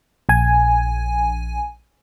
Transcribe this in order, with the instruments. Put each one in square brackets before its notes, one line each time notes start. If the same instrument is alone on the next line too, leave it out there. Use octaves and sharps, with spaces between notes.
[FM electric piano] A#1 G#5